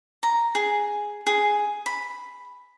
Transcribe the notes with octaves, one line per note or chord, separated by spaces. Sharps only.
A#5
G#4
G#4
B5